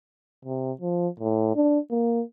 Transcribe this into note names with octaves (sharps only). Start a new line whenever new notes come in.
C3
F3
A2
D4
A#3